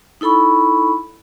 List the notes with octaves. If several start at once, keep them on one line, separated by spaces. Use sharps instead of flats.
D#4 E4 A4 B5 C#6